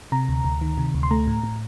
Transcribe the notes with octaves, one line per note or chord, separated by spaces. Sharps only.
C3 A#5
D2
D2
D#3
C3
D2
C6
A3 A#5
A2
A2